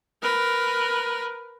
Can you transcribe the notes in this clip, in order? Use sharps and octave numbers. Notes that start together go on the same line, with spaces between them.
A#4 B4